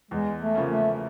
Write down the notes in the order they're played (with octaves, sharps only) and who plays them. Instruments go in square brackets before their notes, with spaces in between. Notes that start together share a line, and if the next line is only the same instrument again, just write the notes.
[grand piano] E2 [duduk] G#3
[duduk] A3
[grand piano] C#3 F3 A#3 C#4
[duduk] A3